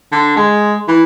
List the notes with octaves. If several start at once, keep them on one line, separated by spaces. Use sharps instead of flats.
D3
G#3
E3